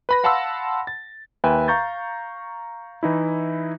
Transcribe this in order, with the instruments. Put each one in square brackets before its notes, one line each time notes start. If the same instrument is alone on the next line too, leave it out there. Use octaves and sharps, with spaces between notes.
[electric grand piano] B4 B5 A#6
F5 F#5 A5 B5 C6 E6
A6
D#2 B4 E5 G5 G#5
F5 A#5 C#6 G6 A6
E3 D#4 E4